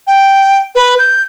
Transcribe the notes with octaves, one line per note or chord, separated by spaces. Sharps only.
G5
B4
G6